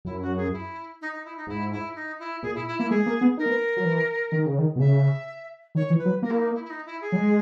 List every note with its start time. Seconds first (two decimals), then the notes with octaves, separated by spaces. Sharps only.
0.05 F#2 E4
0.22 F#4
0.36 G#4
0.52 E4
1.01 D#4
1.12 D#4
1.25 E4
1.36 D#4
1.47 G#2 E4
1.72 E4
1.95 D#4
2.19 E4
2.42 A#2 G#4
2.55 E4
2.67 E4
2.78 A#3 E4
2.90 G#3 G#4
3.06 A#3
3.21 B3
3.37 D#4 A#4
3.46 A#3
3.49 B3
3.77 F#3
3.84 E3
4.32 D#3
4.46 C#3
4.58 D#3
4.76 B2
4.79 C#3 E5
5.75 D#3 C#5
5.90 E3
5.98 B4
6.05 F#3
6.22 A#3 A#4
6.30 E4
6.37 D#4
6.54 E4
6.64 E4
6.69 D#4
6.85 E4
7.01 G#4
7.12 F#3
7.16 G#3